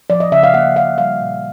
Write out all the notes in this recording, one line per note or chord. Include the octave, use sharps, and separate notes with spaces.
F3 D5
D#5
C#3 E5
F5
A#3 F#5
C#3 F5
G3 F5
A#2